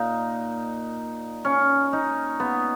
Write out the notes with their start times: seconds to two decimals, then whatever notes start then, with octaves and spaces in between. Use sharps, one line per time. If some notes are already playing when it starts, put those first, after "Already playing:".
Already playing: A#2 D#4
1.45 C#4
1.93 D#4
2.40 B3